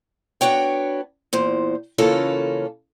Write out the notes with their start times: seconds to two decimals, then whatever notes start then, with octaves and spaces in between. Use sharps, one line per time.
0.41 B3 D4 F#4 C#5 G5
1.33 E2 A#2 C5
1.98 C#3 E3 A#3 C#4 F4 A4